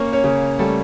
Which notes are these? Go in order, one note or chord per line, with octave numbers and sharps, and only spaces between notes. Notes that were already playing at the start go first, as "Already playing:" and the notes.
Already playing: A#3 C#4 C#5
C#4 C#5
C#3
G3 A3 A4